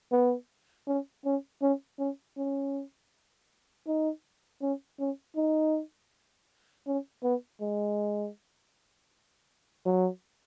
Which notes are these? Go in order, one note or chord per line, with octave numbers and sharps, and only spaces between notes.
B3
C#4
C#4
C#4
C#4
C#4
D#4
C#4
C#4
D#4
C#4
B3
G#3
F#3